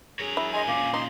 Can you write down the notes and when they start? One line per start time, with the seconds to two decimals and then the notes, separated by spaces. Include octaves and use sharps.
0.19 G#4 A#4 C#5
0.37 E4
0.53 G#4 D#5 G#5 C6
0.67 A#2 C#4 F5 D6
0.94 D#4 C6